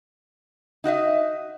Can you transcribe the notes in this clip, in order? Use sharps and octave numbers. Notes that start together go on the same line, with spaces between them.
D#4 F#4 D#5 E5